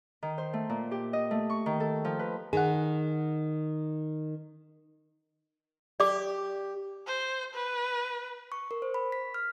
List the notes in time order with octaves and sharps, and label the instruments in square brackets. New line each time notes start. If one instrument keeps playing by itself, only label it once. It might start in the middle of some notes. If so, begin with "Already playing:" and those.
[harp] D#3
C5
A3
A#2
G4
D#5
A3
C#6
D#3
A4
F3
B4
[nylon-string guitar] D#3 [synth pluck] G#4 F#5
[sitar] G4 [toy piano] D5 D6
[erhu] C5
B4
[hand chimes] C#6
A#4
C5
B5
B6
F6